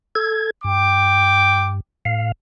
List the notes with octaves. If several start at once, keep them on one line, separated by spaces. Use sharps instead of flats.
A4 G#6
G2 G5 D6
A2 F5